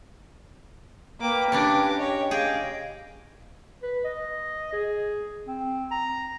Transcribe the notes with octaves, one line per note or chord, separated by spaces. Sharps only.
A#3 B4 G5 D6
C#3 C#4 D4 G4 A#4 D6
C#5 D#5
G#4 D#5 F5 G5 D6
B4
D#5
G#4
C4
A#5